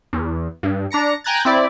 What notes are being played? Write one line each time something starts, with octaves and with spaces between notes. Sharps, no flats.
E2
G2
D4 A#5 A#6 C#7
G5 G#5 A#5 F#6 G#6 A6
C4 E4 D5